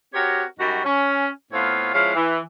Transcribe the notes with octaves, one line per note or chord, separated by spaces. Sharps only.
C4 F#4 G4 A#4 C#5
F#2 G3 D#4 F#4
C#4
A2 B3 C4 F4 C#5 F5
F3 G#3 C#4 E4 F5
E3